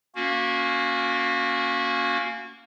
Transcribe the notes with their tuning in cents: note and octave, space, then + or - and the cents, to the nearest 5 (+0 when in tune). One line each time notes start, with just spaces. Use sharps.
A#3 +0 C#4 +5 F#4 -25